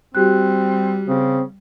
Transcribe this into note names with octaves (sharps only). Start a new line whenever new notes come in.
G3 C4 F#4 G4 F#6
C#3 C4